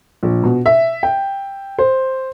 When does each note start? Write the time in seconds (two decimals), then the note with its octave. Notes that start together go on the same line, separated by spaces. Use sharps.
0.23 A#1
0.43 B2
0.66 E5
1.03 G5
1.79 C5